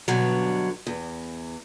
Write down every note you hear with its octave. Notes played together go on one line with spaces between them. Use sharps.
G2 B2 D3 F#3
E2